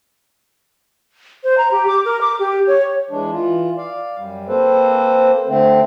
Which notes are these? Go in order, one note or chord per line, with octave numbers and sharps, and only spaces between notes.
C5
A#5
G4
D6
A#4
D6
G4
C#5
E3 G#3 D4
E3 F4
D5 F5
F#2 G3
A#3 C4 A4 B4 C5
D3 A3 C4